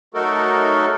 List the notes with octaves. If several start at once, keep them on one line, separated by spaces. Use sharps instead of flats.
F#3 A3 D#4 F#4 A4 A#4